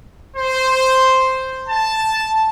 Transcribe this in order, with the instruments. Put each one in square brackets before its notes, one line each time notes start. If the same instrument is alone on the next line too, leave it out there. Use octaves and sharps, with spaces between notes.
[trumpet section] C5
A5